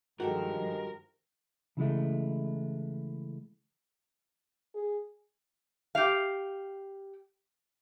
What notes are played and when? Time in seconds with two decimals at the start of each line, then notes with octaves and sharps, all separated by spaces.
0.20 G2 D#3 F3 G#3 F#4 G4 A4 A#4
1.77 C#3 E3 G#3 A3
4.74 G#4
5.95 G4 F5